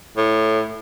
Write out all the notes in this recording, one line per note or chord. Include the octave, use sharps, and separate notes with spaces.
A2